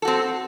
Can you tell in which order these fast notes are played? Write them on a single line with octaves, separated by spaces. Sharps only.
A4 F#4 C4